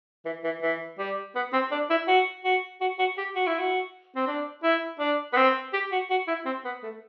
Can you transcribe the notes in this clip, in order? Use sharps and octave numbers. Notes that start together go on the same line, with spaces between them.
E3
E3
E3
G3
B3
C4
D4
E4
F#4
F#4
F#4
F#4
G4
F#4
E4
F#4
C4
D4
E4
D4
B3
C4
G4
F#4
F#4
E4
C4
B3
A3